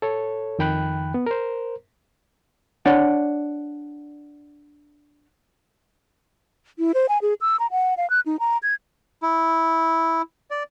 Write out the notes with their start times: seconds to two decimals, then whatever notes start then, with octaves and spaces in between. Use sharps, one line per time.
0.02 A4 C#5
0.59 F2 D#3 G5 B5 F#6
1.14 B3
1.26 A#4 C5
2.86 D4 C#5 D5 F#5
6.79 E4
6.94 C5
7.09 G#5
7.22 G#4
7.41 E6
7.60 A#5
7.71 F#5
7.97 F5
8.10 F#6
8.26 D#4
8.40 A#5
8.63 G#6
9.23 E4
10.51 D5